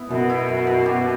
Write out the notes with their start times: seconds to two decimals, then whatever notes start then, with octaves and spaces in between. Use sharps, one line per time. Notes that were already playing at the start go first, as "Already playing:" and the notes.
Already playing: B3 E4
0.10 F#2 B2
0.30 E4
0.48 F#2
0.67 F#2
0.86 G4